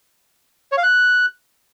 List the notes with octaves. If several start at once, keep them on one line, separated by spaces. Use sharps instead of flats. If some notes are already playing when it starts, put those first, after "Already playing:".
C#5
F5
F#6